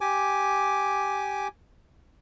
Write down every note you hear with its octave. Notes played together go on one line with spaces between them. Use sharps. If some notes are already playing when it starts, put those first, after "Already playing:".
G4 G#5 D6